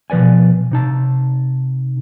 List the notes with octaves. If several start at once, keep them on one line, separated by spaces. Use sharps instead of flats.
B2 F3 B4 D5 G#5
C3 D#4 A5